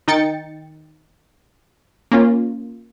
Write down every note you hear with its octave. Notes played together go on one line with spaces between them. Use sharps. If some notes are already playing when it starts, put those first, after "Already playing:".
D#3 D#4 G5 A6 C#7
A#3 C#4 F4